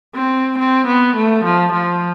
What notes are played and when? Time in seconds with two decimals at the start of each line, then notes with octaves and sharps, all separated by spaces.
0.15 C4
0.58 C4
0.87 B3
1.17 A3
1.45 F3
1.73 F3